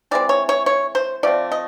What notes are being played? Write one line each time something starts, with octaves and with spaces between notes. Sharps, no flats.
E3 G#3 C4 D5
C#5
C#5
C#5
C5
F3 A3 C4 D5
D#5